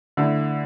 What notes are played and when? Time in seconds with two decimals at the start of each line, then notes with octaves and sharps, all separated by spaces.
0.17 D3 A3 E4